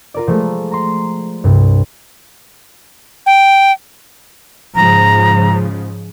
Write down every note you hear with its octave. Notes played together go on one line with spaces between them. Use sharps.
F4 A#4 D5
F3 G#3 A3
A#5 C6
C2 G2
G5
G#2 C#3 F3 A#5